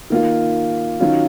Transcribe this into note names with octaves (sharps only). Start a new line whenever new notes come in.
D#3 A#3 F4
D#3 F#3 C#4 F4